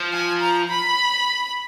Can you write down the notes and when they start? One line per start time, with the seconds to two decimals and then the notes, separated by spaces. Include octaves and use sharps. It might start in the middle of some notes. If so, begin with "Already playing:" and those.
Already playing: F3
0.13 G#5
0.41 A#5
0.69 B5